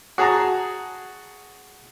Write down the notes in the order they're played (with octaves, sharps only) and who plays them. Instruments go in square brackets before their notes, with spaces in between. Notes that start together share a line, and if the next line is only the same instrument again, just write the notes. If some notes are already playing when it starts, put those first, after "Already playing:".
[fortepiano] F#4 G#4 A5 A#5